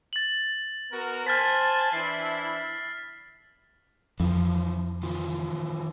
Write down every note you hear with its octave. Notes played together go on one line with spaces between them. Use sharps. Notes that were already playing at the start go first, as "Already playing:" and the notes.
A6 F#7
B3 F#4 A#4
C5 G#5 A5 F6 A6 B6
E3 D4 E4 C7
F2 E3 F3
D#3 E3 F4